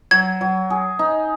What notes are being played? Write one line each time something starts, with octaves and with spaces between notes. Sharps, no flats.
F#3 G#6
F#3
G#4
D#4